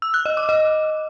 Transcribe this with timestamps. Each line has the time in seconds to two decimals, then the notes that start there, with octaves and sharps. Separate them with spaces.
0.02 E6
0.14 F#6
0.26 D#5
0.37 D6
0.49 D#5